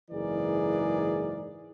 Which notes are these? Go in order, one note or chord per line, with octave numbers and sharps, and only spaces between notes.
F#1 G#2 E3 G#4 A#4 D5